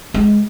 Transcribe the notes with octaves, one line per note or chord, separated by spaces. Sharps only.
G#3